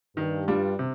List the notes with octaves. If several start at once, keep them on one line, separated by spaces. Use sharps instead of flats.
G2 D#3
G3 D4 F4
C3